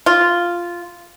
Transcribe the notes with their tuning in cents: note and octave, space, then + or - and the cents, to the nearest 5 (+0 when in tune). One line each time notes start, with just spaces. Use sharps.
F4 -5